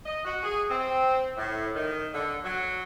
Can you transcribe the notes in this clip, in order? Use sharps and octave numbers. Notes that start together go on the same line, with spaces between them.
D#5
F#4
G#4
C4
A2
D#3
D3
F#3